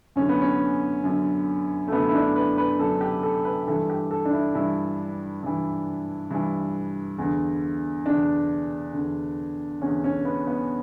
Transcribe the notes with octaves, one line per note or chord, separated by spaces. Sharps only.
F#2 D3 C#4
B3
C#4
F#2 D3
A3
F#2 D3 B3
E4
D4
B4
B4
F#2 D3 A4
G4
A4
B4
G2 E3 A4
G4
A4
D4
E4
G2 E3 E4
G2 E3
G2 E3
E2 D3
E2 D3 D4
E2 D3
E2 D3 C#4
C#4
B3
B3